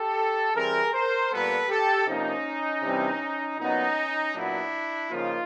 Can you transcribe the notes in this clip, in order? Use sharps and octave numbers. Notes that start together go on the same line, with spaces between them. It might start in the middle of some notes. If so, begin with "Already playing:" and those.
Already playing: G4 A4
E3 G3 C4 G#4 A#4
A#4 C5
A#2 G3 B3 A4 B4
G4 A4
C3 F3 A#3 C#4 D#4
C3 E3 G3 C4
A#2 F#3 B3 C#4 D#4
A#2 F#3 B3 D4 E4
C#3 F3 A#3 D#4 F4